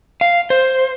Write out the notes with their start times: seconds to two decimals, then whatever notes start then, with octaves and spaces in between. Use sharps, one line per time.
0.21 F5
0.50 C5